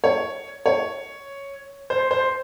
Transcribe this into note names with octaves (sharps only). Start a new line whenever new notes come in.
C#5
C#5
C5
C5